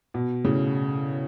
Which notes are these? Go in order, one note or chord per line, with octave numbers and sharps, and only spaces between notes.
B2
A2 C#3